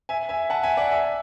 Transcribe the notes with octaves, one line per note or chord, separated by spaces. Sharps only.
E5 G#5
E5 G#5
F#5 A5
E5 G#5
D5 F#5
E5 G#5